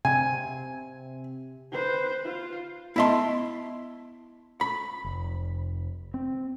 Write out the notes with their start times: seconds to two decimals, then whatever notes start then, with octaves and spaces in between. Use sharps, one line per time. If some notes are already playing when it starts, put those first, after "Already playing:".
0.05 C3 G#5
1.72 B4 C5
2.25 F4
2.96 B3 E4 D#5 E5 A5 C6
4.61 B5
5.05 F1
6.14 C4